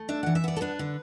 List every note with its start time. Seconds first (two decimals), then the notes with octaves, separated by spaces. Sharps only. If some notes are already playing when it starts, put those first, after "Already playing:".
Already playing: A3
0.09 D4 E5
0.23 E3 F#5
0.35 E5
0.44 B3 D5
0.57 A4
0.61 D4 B4
0.79 D3